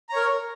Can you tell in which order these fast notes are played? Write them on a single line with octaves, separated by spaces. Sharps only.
A#5 C#5 A#4